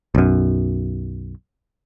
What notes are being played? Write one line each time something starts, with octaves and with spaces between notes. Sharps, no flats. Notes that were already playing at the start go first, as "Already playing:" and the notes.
B1 F#2